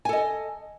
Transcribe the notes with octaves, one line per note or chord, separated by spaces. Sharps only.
A4 D#5 G#5